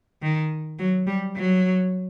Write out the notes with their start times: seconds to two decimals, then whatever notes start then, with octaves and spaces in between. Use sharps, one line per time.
0.22 D#3
0.79 F#3
1.07 G3
1.36 F#3